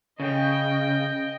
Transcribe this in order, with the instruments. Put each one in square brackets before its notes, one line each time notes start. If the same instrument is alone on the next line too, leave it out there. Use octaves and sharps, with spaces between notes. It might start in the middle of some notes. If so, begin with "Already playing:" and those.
[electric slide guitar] C#3 [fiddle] D#5 G5